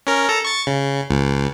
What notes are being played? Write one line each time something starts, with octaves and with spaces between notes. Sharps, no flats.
C#4 A#4
A4 A#5
C#6 A6
C#3
C#2